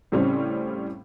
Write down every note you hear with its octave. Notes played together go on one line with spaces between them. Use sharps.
A2 C#3 G3 C4 C#4